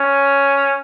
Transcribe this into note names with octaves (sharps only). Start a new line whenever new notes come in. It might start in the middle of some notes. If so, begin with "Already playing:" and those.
Already playing: C#4